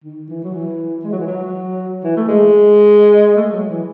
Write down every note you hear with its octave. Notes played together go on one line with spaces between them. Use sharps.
D#3
E3
F#3
E3
G#3
F#3
E3
F#3
E3
A3
G#3
A3
G#3
F#3
E3